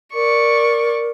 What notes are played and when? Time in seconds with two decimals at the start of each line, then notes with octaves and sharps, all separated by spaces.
0.14 A#4 D5 C#6